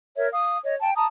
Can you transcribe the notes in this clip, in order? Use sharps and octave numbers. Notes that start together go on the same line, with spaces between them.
A#4 C#5 E5
F5 D#6
C#5 D#5
G5 A5
A5 A#5 D#6